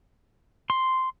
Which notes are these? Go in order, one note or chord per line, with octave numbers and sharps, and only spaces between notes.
C6